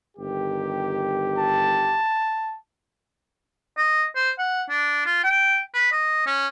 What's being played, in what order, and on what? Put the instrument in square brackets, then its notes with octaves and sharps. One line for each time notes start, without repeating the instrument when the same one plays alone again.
[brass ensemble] G1 D#3 G4
[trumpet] A5
[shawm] D#5
C5
F#5
D4
F4
G5
B4
D#5
C#4